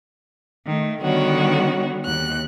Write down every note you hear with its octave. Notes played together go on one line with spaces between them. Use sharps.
D#3 A3
D3 D#3 G3 B3 F#4 C#5
D#2 F#6